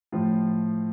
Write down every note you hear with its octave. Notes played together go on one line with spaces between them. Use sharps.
A2 F3 F4